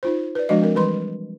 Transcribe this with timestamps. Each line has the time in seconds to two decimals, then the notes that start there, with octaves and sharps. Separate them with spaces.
0.03 D#4 F4 C5
0.35 B4 D5
0.49 F3 G#3 D4 F#4 D#5
0.62 C4 A#4
0.75 E3 G3 B4 B5 C6